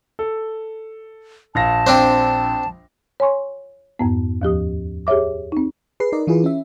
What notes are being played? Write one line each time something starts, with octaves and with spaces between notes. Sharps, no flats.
A4
A#1 F5 A5 A#6
C4 D4 C5
C#5 G#5 C6 C#6
F2 G#2 B3
D#2 F3 G4 D#6
G4 G#4 C#5 E5 D6
C4 D#4
G#4 B4 C7
D#4 A#4 D5 D#5
E3 E4 F4 G#4 B4
C#4 E5